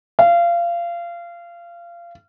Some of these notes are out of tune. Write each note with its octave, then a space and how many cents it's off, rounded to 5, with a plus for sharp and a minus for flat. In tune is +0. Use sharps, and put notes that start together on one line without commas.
F5 -25